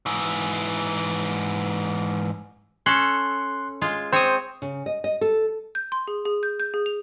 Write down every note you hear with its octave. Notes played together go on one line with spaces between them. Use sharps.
G#2 E3
C#4 A4 C6 F#6
G#3 F4
C4 C5 C#5 D#6
C#3
D#5
D#5
A4
G6
C6
G#4
G#4
G6
G6
G#4
F7